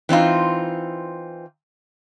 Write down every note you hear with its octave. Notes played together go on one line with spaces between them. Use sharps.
E3 C4 D#4 F4